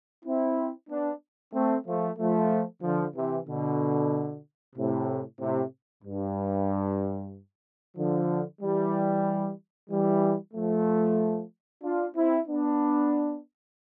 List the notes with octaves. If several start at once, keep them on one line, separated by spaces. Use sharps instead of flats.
C4 E4
B3 D4
A3 C4
F3 A3
F3 A3
D3 F3
C3 E3
B2 D3
A2 C3
A2 C3
G2
D3 F3
E3 G3
E3 G3
F3 A3
D4 F4
C4 E4
B3 D4